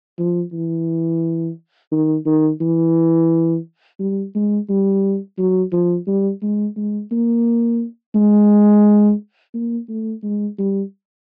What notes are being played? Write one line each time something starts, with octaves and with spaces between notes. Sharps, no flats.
F3
E3
D#3
D#3
E3
G3
G#3
G3
F#3
F3
G3
G#3
G#3
A#3
G#3
A#3
A3
G#3
G3